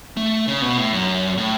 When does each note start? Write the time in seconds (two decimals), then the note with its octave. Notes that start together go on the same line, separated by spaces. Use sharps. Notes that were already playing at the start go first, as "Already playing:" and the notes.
0.17 A3
0.48 C#3
0.62 B2
0.77 A2
0.93 F#2
1.37 A2